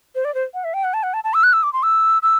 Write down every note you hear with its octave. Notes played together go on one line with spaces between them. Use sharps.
C5
D5
C5
F#5
E5
G5
F#5
A5
F#5
A5
A5
E6
F#6
E6
D6
C6
E6
E6